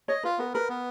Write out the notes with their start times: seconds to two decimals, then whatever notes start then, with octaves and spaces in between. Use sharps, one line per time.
0.08 C#5 D#5
0.23 F4 B4
0.38 B3 A#4
0.54 A#4 B4
0.69 B3